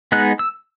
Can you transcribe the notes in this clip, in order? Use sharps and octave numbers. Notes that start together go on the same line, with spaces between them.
G#3 B3 D#4 F#6
E6